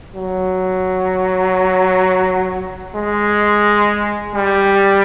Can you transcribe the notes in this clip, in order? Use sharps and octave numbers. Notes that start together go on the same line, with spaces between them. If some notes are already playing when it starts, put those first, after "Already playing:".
F#3
G#3
G3